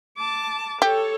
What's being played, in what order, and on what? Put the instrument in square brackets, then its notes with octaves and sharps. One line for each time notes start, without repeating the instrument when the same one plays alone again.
[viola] A5 D6
[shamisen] G4 [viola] A4 C#5